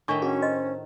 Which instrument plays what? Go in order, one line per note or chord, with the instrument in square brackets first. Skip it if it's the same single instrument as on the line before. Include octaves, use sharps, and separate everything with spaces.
[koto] A2 D#3 E5 [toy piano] D4 C#6
[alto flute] C#4 [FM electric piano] F#4 [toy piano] G#4
[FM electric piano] C5 [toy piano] D#5